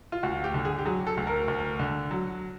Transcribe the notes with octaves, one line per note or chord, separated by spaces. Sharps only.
F4
D2 F#4
G4
D3
G#4
G4
F#3 G#4
A4
D2
A#4
D2
D3
F#3